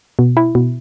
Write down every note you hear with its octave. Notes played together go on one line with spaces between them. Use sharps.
B2
E4
B2